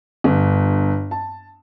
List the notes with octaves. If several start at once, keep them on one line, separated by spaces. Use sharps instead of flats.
G1
A5